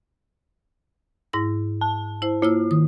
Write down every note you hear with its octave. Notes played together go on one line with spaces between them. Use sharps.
G#2 E4 A#6
A5
E4 C5
A#3 E4 F4 E6
D#3 D#6